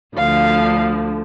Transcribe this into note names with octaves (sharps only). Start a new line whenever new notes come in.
D2 D3 F3 F5